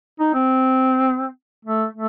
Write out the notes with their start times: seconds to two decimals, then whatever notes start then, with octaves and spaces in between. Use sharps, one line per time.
0.20 D#4
0.34 C4
1.65 A3
1.93 A3